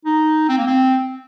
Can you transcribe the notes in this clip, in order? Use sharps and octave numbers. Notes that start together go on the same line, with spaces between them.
D#4
C4
A#3
C4